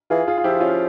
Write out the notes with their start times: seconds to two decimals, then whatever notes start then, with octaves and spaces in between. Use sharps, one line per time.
0.10 E3 F4 G#4
0.28 F4 G#4
0.38 F4
0.44 F3 E4 G4
0.60 C#4 F4